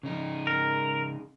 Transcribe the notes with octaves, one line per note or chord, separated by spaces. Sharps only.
C#3 D#4
A#4